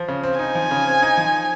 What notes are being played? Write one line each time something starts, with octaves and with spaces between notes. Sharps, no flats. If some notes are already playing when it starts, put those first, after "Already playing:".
Already playing: F3
C#3
C4
D#4 G#5
F3
C#3
C4
D#4
F3